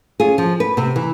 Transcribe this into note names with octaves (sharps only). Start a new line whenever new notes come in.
C#4 F4 G#4
F3
B4
C3 C4
E3